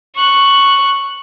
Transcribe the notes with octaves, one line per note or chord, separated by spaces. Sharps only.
C#6 F#6